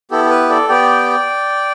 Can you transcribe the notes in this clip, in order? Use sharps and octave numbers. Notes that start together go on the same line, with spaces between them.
B3 E4 G4 A4
A4
B4
A4 D5
B3 G4 D5 G5